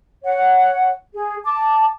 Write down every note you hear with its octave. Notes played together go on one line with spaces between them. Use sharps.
C#5 F#5
G#4
A5 D6